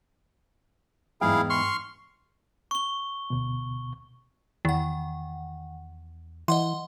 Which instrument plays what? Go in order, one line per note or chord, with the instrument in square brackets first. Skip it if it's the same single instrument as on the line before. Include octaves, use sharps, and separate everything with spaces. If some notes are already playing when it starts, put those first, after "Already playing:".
[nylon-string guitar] E2 G#2 G5 [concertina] E4 G#4 F5
[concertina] C6 C#6 F6
[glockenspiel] C#6 G7
[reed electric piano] D2 B2
[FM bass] E2 [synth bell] D#3 F#5
[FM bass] E3 [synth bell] D#5 F#5 C6